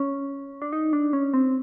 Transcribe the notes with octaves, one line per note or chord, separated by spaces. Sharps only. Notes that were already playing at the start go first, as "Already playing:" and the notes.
Already playing: C#4
D4
D#4
D4
C#4
C4